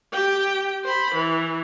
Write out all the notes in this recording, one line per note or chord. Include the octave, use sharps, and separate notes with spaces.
G4 G5
C5 B5
E3